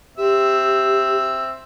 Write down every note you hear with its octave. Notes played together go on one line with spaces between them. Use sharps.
C4 G4 E5